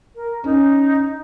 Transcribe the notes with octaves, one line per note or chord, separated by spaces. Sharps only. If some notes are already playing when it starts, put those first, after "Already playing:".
A#4
C#4 D#4